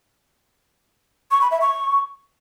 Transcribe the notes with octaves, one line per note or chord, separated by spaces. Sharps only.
C#6
B5
E5
C#6